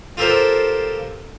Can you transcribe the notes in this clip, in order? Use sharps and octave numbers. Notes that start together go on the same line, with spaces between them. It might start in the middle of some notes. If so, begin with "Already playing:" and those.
F4 G4 A4 A#4 C5